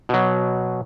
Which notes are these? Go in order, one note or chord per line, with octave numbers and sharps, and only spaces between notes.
B2 F#3